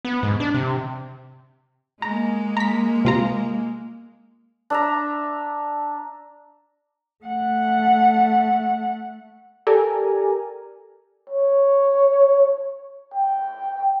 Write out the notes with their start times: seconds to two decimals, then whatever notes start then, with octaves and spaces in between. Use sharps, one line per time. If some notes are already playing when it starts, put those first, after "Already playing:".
0.05 B3
0.23 G#2
0.40 D4
0.54 C3
2.02 G#3 A#3 A#5
2.57 A#5 B6
3.05 C3 F4 A#5
4.70 D4 E5 A#5
7.24 A3 F#5
9.67 G4 A4 A#4 D5 G#5 A#5
11.30 C#5
13.14 G5